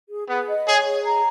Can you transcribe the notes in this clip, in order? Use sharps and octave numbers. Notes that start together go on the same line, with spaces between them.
G#4
B3 G#4
D#5
G#4 C#5
G#4
A#5